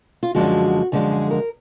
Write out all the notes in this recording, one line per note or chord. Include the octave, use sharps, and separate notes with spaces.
F4
F#2 D3 F3 G#3 F#4
F#2 D3 F3 G#3
G#4
A#4